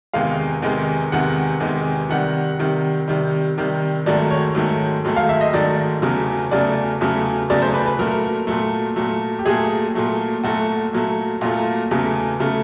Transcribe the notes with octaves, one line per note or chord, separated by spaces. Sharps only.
E2 C3 D#3 G#3 F5
E2 C3 D#3 G#3
E2 C3 D#3 G#3 F#5
E2 C3 D#3 G#3
C3 D#3 G3 F#5
C3 D#3 G3
C3 D#3 G3
C3 D#3 G3
G#2 D#3 F#3 A3 D5
C#5
G#2 D#3 F#3 A3
G#2 D#3 F#3 A3
F5
E5
D#5
G#2 D#3 F#3 A3 D5
E2 C#3 F#3 A3
E2 C#3 F#3 A3 D5
E2 C#3 F#3 A3
E2 C#3 F#3 A3 D5
C5
B4
B4
A#2 F#3 A3 A#4
A#2 F#3 A3
A#2 F#3 A3
G4
A#2 F#3 A3 G#4
A#2 F#3 A3
A#2 F#3 A3 F#4
A#2 F#3 A3
A#2 F#3 A3 F4
E2 C#3 F#3 A3
C#3 F#3 A3